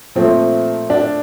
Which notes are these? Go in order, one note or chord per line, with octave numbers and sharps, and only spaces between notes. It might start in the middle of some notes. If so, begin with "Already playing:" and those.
A#2 F3 A3 C4
D4